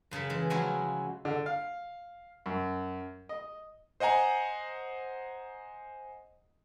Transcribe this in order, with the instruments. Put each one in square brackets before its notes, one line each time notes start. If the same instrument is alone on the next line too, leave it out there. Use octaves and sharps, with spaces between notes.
[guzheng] F#2 C#3 A5 B5
E3 G#3
F3 F#3 G#3 C#4 E4 F#4
[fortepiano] D3
F5
F#2
D#5
[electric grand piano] C5 D#5 F#5 G#5 A#5